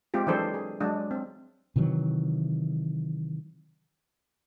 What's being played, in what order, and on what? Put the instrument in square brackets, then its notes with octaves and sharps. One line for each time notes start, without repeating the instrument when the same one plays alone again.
[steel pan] G#3 C4 F4 G4
E3 F#3 D4 G#4 A4 C5
G#4
F#3 G#3 D4
C4
[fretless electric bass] C3 D#3 E3 F#3